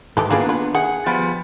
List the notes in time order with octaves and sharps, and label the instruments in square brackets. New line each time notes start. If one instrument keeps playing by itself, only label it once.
[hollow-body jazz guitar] G#2 D#3 E3 [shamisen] G4 A4 B4
[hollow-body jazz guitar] D#3 A#3 B3 [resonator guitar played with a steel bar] D4 [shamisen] F4 G#4 B4
[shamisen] F4 B4
[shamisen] D#3 [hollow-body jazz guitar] G#4 [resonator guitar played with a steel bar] F#5
[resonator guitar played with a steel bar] F3 G3 B3